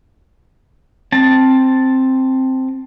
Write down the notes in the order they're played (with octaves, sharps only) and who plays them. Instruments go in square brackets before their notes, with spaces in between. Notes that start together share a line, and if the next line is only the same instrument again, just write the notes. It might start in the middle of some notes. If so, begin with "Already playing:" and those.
[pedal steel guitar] C4 A5